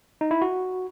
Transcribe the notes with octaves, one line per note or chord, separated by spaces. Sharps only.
D#4
E4
F#4